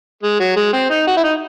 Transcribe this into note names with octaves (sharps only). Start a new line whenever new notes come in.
G#3
F#3
G#3
C4
D#4
F#4
E4
D#4